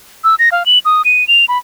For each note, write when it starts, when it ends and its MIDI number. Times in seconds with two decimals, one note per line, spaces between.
0.24 0.35 88
0.39 0.49 94
0.52 0.66 77
0.66 0.79 102
0.85 1.02 87
1.05 1.27 99
1.28 1.45 101
1.48 1.58 83